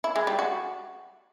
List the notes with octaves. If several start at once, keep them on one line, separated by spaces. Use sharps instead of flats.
E4
G#3
G3
F#4